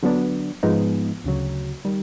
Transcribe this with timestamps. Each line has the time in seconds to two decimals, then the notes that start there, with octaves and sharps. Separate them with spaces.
0.03 D3 F#3 B3 D4
0.63 G#2 F3 G#3 B3 D#4
1.24 D2 C#3 F#3
1.85 D#3 G3